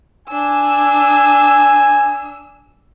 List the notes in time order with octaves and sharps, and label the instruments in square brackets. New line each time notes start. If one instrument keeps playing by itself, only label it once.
[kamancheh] D4 E6 [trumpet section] G#5